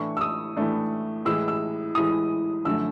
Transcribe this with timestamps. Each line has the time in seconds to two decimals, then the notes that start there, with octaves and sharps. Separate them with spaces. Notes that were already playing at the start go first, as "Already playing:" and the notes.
Already playing: A2 E3 A3 D4 C#6
0.17 E6
0.21 D#6
0.57 A2 E3 A3 D4
1.25 A2 E3 G#3 E6
1.48 E6
1.95 A2 E3 G#3 D#6
2.65 F#2 D3 F3 A3 E6